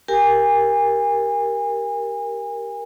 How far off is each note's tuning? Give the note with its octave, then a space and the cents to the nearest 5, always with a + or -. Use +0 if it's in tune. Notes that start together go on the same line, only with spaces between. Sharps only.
G4 +0 A#4 +0 G#5 -35